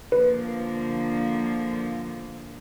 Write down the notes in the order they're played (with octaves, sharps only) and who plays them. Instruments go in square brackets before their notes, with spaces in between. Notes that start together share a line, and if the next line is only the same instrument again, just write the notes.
[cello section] D3 F3 A#3 [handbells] B4